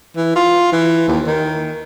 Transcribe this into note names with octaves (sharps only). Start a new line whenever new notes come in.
E3
F4
E3
D#2
D#3